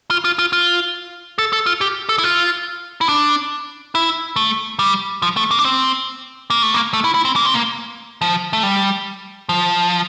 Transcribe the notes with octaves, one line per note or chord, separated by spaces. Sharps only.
F4
F4
F4
F4
A4
A4
F4
G4
A4
E4
F4
E4
D4
E4
A3
G3
F3
A3
A#3
D4
C4
A#3
A3
A#3
A3
E4
E4
C4
A#3
C4
A#3
F3
A3
G3
F3